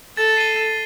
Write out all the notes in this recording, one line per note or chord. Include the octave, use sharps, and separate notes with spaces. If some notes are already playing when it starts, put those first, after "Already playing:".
A4 A6
C7 D#7 G7
A6